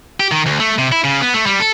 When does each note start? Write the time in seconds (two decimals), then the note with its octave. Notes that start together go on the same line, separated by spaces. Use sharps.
0.20 G4
0.32 D#3
0.46 D2
0.60 A3
0.78 C3
0.92 E4
1.04 C#3
1.21 B3
1.34 A3
1.46 G3
1.60 A4